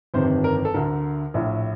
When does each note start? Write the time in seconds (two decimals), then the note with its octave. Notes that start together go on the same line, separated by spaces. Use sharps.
0.14 G1 F2 C3 D#3 C5
0.44 A#4
0.65 A4
0.74 D2 D3 A#4
1.34 A#1 A2